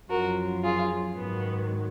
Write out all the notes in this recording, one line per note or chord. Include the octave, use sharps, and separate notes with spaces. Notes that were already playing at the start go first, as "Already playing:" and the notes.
F#2 F3 F#4 A#4
F4 G#4
G#2 D#3 F#3 B3